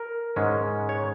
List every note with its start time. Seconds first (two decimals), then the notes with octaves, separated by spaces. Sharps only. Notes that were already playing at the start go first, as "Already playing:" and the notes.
Already playing: A#4
0.36 G#2 G#3 C#4
0.89 C#5